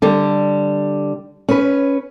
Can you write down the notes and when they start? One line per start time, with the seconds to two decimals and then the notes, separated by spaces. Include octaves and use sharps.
0.02 D3 G3
1.49 C#4 B4